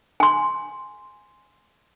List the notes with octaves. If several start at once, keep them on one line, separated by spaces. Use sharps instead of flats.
G#5 C6